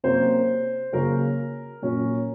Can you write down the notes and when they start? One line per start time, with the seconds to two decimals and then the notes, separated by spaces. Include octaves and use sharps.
0.04 C3 F#3 A#3 C#4 C5
0.93 C#3 F#3 A#3 C#4 A#4
1.82 A#2 F#3 C#4